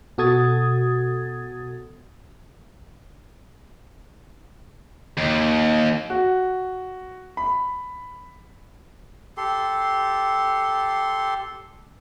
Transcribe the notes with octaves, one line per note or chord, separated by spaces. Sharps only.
B2 F#4 A4 D#6 G#6 A6
D#2
F#4
B5
G4 A4 C6